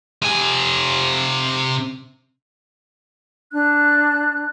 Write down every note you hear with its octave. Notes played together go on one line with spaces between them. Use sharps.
C3 G#5
D4 F#6